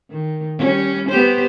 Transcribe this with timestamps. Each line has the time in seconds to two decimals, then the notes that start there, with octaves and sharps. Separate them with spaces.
0.11 D#3
0.58 G3 C#4
1.10 B3 G4 C5